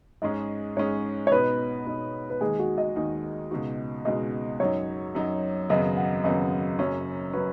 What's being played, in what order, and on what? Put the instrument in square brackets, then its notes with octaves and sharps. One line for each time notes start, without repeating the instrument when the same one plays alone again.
[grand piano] G#2 G#3 C#4 G#4 [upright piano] D#5
[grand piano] G#2 G#3 C#4 G#4 [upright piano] C#5
[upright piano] C#5
[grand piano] B2 B3 D#4 [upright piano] B4
[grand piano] B2 B3 D#4
[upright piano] B4
[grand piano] D#2 D#3 G#3 D#4 [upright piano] G#4
[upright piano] F#4
D#5
[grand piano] D#2 D#3 G#3 D#4
C#2 B2 G#3 D#4 F#4
[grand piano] C#2 B2 G#3 D#4 F#4 [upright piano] D#5
[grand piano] F#2 F#3 D#4 [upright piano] C#5
[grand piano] F#2 F#3 D#4
[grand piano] G#1 F#2 C#3 F#3 B3 [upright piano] D#5
[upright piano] F#5
[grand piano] G#1 F#2 C#3 F#3 B3 [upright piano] D#5
[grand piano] F#1 F#2 F#3 C#4 [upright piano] C#5
[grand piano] F#3 C#4 [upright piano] B4